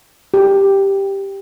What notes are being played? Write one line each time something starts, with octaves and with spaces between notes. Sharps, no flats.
G4